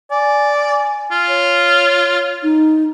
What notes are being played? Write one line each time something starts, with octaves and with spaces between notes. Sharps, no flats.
D5 G#5
F4
C#5
D#4